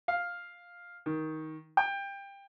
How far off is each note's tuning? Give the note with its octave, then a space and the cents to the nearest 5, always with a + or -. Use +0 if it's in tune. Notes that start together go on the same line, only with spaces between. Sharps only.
F5 +5
D#3 +15
G5 +20